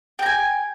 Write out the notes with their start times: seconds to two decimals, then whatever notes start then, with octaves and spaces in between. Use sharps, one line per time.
0.19 G5
0.22 A#5
0.26 G#5